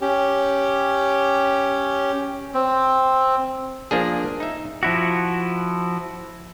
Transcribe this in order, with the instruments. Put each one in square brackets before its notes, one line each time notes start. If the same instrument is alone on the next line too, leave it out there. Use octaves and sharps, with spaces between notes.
[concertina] C#4 G4
[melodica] C4
[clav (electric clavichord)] F3 A#3 D4 G#4
D#4 E5
[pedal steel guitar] F3 E4 F#4